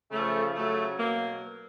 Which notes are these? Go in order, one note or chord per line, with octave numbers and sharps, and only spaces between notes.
C#3 F3 A3
C#3 F#3 A3
B2 F#3 A#3